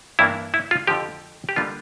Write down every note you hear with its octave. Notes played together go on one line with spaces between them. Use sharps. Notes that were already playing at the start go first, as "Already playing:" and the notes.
G2 E3 A#3 D4 E4
E4
F4
F2 D3 F3 G4
G4
D3 G3 A#3 D4 F4